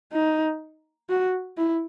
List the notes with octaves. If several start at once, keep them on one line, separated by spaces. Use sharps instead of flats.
D#4
F#4
E4